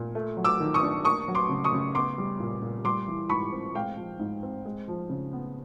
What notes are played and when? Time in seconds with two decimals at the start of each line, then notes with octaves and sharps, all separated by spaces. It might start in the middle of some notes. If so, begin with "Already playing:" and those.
Already playing: A#2
0.15 A3
0.37 F#3
0.44 D6 E6
0.60 D#3
0.74 C#6 D#6
0.83 D4
1.05 A#3 C#6 D#6
1.28 F#3
1.35 C6 D6
1.49 C#3
1.64 C#6 D#6
1.73 C#3
1.95 B3 C6 D6
2.18 G3
2.40 A#2
2.62 A#2
2.85 G3 C6 D6
3.08 E3
3.29 G#2 B5 C#6
3.52 C4
3.74 G#3 F5 G5
3.97 F3
4.19 G#2
4.43 C4
4.65 G#3
4.88 F3
5.10 C#3
5.33 B3